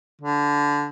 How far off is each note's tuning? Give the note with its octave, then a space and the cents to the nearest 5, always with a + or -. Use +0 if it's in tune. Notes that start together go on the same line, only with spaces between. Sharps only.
D3 -15